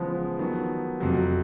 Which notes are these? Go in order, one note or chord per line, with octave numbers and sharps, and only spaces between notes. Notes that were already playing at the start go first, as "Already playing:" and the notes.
Already playing: C#3 E3 F3 G#3 B3
D#3 F#3 B3
F2 C3 F3 F#3